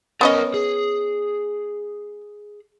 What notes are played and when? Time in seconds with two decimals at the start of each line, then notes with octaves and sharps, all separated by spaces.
0.21 B3 C#4 A#4 D#5 F#5
0.54 G#4